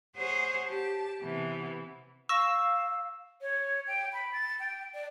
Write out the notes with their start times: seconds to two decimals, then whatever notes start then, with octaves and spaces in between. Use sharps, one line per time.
0.16 G#4 C5 C#5 F#5
0.68 G4 A5
1.22 C3 E3 B3
2.29 F5 C#6 E6 A#6
3.41 C#5
3.87 G5
4.12 B5
4.32 A6
4.59 G5
4.94 D5